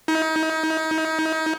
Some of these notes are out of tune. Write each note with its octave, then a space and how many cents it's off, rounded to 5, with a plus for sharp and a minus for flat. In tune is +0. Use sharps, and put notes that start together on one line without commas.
D#4 +35